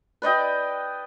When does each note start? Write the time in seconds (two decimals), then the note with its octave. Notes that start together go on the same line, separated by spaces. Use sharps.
0.22 B4 D5 D#5 G5